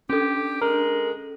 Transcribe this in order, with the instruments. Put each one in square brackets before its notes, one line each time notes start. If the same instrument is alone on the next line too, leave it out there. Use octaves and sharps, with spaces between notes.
[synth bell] C#4 A4 [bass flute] D4 [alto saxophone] G4
[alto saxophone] G#3 [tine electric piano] A#4